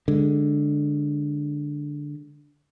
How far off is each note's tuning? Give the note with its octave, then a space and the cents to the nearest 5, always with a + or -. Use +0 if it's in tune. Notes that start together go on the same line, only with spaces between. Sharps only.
D3 +0 G#3 +0